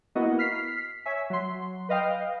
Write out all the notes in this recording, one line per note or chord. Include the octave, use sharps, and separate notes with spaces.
A#3 B3 E4 F#4 D#5
F6 B6 C7
C#5 E5 G#5 B6
F#3 C6
B4 D#5 F5 G5